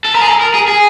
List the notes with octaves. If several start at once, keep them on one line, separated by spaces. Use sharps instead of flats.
A4
A#4
G#4
A4
A#4
G#4
G#4